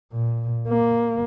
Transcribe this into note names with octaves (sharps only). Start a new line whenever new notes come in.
A#2
A#3